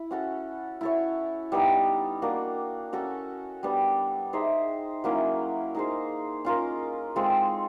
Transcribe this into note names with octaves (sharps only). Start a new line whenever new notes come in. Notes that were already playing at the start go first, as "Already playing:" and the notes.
Already playing: E4
C#4 F#4 A4
E4 A4 C#5
G3 B3 D#4
A#3 D4 F#4
C#4 F#4 A4
G3 B3 D4
D#4 G#4 C5 E5
F#3 A#3 C#4 E4
D#4 G#4 C5
C#4 F4 A#4
G#3 C4 F4 A4